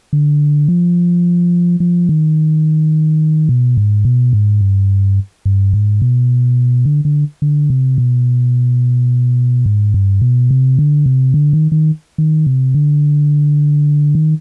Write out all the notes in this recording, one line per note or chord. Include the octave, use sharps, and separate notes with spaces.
D3
F3
F3
D#3
B2
G#2
B2
G#2
G2
G2
G#2
B2
D3
D3
D3
C3
B2
G#2
G2
B2
C3
D3
C3
D3
D#3
D#3
D#3
C3
D3
D#3